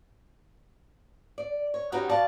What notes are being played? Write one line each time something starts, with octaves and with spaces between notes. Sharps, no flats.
D5
C#5
G3 B3 C#4 D#4 F#4 G4
B2 D5 F5 A5